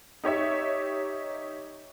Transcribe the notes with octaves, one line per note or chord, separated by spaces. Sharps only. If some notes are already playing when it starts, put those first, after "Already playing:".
D#4 G4 C#5 E5